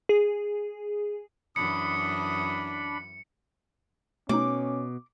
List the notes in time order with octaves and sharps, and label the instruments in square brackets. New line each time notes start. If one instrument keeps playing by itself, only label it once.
[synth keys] G#4
[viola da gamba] F#2 E3 [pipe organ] D4 B5 [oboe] D#6 [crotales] C#7
[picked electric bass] B2 [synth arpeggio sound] A3 D#4 [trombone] C#4 [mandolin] D6